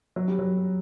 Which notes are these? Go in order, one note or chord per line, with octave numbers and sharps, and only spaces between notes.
F#3
G3
F#3